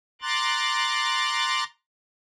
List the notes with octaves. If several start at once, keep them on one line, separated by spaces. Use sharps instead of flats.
A#5 C6 D6 F#6 A6